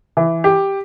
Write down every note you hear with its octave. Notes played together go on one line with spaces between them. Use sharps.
E3
G4